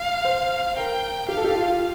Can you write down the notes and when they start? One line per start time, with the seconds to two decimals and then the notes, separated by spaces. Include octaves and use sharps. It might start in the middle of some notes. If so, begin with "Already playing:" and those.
Already playing: F5
0.25 C5
0.77 A#4 G5
1.28 G4 F5
1.37 A4
1.44 G4
1.55 F4